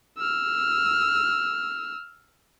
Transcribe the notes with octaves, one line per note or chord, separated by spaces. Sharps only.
E6 F6